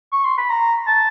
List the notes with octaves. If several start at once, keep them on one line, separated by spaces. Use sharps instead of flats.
C#6
C6
B5
A#5
A5